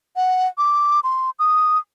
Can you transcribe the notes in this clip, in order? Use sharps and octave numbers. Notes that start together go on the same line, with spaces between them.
F#5
D6
C6
D#6